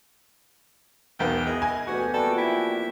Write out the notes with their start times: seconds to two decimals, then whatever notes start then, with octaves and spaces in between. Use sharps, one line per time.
1.19 E1 B1 B3 G5
1.46 E4 G#4 D#5
1.62 G#5
1.87 D2 E3 A3 B3 F#4 G4
2.14 C3 F3 G3 A#3 F#4 A4 G5
2.38 E4